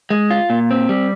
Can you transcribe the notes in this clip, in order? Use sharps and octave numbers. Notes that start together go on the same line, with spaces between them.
G#3
F4
A#2
C4
G3